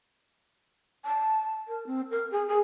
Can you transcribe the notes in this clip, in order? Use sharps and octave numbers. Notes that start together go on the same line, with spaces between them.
A5
A#4
C4
A#4
G#4
G#4